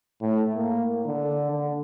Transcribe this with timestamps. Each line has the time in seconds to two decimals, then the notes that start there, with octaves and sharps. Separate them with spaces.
0.22 A2
0.55 A#3
1.06 D3
1.51 D3